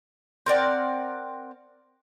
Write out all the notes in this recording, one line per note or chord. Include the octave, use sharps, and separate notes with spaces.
C4 A#4 D5 F#5